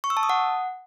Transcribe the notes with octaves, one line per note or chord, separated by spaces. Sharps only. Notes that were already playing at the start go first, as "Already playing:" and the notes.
C#6
E6
A5
D#6
F#5